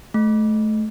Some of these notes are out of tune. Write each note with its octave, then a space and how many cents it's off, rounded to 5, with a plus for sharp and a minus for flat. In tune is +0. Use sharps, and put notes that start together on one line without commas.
A3 -25